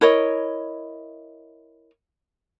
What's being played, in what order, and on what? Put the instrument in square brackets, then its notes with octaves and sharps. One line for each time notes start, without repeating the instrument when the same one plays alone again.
[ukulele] E4 A#4 C#5 D#5